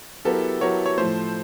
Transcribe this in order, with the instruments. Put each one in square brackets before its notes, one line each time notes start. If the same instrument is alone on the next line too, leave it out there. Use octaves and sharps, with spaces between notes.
[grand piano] F#3 B3 E4 G4 A#4 [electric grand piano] A4
[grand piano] F#3 B3 E4 G4 A#4 [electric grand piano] C#5
[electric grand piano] C#5
[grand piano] A2 F3 A3 [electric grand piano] C5